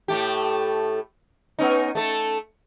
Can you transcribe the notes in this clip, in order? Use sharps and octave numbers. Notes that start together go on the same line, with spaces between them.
A2 A3 G4
B3 C#4 D#4
A3 A4